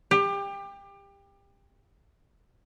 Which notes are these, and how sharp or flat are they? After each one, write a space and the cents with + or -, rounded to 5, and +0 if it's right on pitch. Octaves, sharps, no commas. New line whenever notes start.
G4 +25